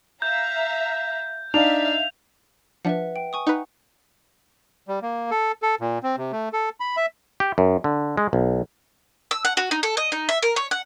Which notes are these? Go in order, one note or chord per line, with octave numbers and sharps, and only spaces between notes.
E5 F5 A#5 G6
D4 D#4 E5 F5 F7
F3 D4 B4 E5 F#5
G5
G#5 C#6 D#6
D#4 B4 F#5
G3
A#3
A4
A4
A#2
C4
C3
A3
A4
B5
E5
G4
F#2
D3
G#3
B1
E6
F#5
F#4
D#4
A4
D#5
D#4
E5
A#4
C#5
F#5